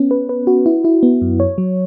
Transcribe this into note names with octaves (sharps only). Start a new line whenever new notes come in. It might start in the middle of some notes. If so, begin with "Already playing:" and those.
Already playing: B3 C#4
B4
B4
F#4
E4
E4
B3
F#2
C#5
F#3